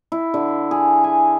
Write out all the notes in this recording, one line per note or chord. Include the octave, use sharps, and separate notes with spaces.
E4
D3
G#4
G#5